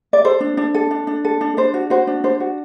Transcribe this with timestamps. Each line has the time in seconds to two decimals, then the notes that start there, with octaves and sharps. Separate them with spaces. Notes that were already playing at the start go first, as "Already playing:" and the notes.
0.13 D5
0.25 A4 C5
0.40 D4
0.57 D4
0.74 A4
0.91 D4
1.07 D4
1.25 A4
1.41 D4
1.57 D4 C5
1.74 F#4
1.90 F#4 C5
2.07 D4
2.24 D4 C5
2.40 F#4